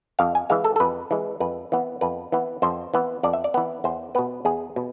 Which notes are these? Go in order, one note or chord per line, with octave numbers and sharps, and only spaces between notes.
F2 F5
G#5
E3 G#3 F5
A4
A4
F2 B4
E3 G#3
F2 B4
E3 B3
F2 B4
E3 B3
F2 C5
E3 B3
F2 D5
E5
D5
E3 B3
E2 C5
B2 B3 B4
E2 G#4
B2